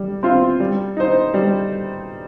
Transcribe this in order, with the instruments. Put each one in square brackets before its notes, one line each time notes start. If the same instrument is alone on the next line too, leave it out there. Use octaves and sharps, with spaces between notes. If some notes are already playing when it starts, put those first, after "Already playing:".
Already playing: [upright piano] G3
C4 F4
G3
D#4 C5
G3